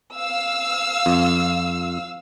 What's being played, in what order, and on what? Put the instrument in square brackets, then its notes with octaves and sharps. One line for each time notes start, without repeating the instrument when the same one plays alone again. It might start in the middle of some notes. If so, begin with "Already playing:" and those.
[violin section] F5 E6
[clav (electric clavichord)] F2